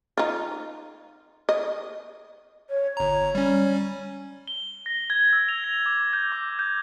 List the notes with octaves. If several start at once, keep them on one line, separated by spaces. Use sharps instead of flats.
D#4 F4
D#5
C#5
G1 C#5 A#5
G3 C#4
G7
A#6
G#6
E6
F7
A#6
D6
G6
D6
G6